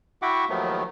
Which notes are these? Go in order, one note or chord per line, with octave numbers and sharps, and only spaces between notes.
E4 F#4 E5 F#5 G5 D6
D#2 D#3 F3 F#3 A3 B3